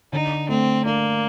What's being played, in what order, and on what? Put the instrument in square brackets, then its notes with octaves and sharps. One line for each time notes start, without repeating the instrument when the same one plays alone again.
[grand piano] D3 [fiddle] D#4
[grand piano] A3 [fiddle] C4
[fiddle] A#3 [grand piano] D4